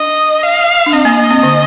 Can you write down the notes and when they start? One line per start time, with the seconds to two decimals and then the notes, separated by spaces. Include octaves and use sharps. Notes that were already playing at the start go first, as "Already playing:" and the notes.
Already playing: D4 D#5
0.43 F5
0.86 D4
0.92 C4 D#5
1.05 A#3
1.17 A#3
1.30 C4
1.43 D3